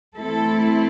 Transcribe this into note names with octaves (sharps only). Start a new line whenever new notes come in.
E3 A3 C4 E4 A4